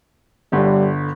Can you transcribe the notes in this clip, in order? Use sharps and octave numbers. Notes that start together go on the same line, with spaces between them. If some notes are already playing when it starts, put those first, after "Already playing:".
G1 D3 G3